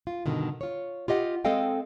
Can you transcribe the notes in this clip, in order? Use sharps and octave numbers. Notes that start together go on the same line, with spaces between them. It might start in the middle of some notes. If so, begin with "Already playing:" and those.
F4
G2 B2 D3 D#3
F4 C#5
F4 G4 D#5 F5 F#5
G#3 C4 A4 D#5 F5 G5